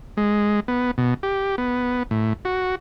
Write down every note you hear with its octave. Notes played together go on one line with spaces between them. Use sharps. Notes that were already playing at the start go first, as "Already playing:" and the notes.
G#3
B3
B2
G4
B3
A2
F#4